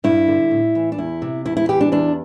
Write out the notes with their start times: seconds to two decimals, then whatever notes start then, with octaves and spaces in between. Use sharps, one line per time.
0.04 G2 E4
0.28 D3
0.51 A2
0.75 E3
0.92 D4
0.98 E2 E4
1.22 C3
1.45 E2 E4
1.57 E4
1.69 E3 G4
1.81 D4
1.92 E2 D4